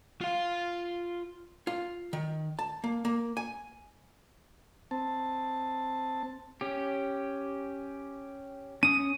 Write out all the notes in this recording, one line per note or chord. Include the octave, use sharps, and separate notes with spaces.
F4 F5
F4
D#3
A5
A#3
A#3
G#5
C4 A5
C#4 G4
C#4 D#6 D#7